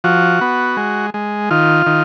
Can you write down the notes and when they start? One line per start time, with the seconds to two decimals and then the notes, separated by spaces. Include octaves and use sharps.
0.04 F3 F#4
0.41 B3
0.77 G#3
1.14 G#3
1.51 D#3 F4
1.86 D#3